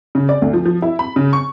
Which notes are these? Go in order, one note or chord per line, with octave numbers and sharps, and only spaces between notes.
C#3
D5
D2
F3
F3
E4
B5
C#3
C#6